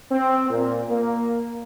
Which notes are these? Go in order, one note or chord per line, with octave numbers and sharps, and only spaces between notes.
C4
A#2
A#3